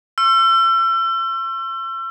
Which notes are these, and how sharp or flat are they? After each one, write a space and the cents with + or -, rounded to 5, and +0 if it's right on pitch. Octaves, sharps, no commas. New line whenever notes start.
C#6 -45 E6 +35